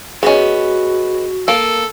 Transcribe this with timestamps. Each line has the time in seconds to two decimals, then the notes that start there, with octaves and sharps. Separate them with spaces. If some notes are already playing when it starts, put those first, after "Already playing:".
0.23 B3 C#4 F#4 G#4 D#5
1.48 A#3 A4